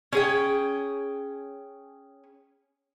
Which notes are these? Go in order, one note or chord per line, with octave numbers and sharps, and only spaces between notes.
C#4 G#4 G5